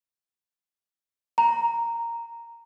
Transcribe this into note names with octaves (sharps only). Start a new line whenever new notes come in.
A#5